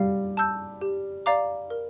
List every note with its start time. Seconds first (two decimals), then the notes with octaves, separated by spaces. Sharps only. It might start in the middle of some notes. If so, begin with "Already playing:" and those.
Already playing: G3 F5
0.37 A5 E6 G6
0.81 G4
1.26 D5 F5 A#5 D6
1.70 A#4